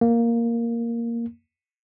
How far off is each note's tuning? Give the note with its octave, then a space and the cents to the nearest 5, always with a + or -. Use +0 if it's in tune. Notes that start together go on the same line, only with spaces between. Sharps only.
A#3 +0